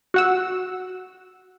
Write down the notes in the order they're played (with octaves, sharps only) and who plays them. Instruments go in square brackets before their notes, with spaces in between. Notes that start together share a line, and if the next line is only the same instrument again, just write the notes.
[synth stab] F#4 F#5 E6